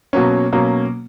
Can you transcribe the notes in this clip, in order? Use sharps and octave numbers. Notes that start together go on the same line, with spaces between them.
B2 F#3 A#3 C#4
B2 F#3 A#3 C#4